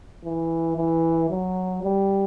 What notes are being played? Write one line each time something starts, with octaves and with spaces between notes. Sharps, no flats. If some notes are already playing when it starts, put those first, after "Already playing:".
E3
E3
F#3
G3